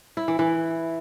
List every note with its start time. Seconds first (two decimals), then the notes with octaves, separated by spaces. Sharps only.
0.17 E4
0.28 E3
0.39 E3